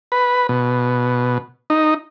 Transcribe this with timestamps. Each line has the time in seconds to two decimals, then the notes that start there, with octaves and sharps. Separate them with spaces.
0.12 B4
0.49 B2
1.70 D#4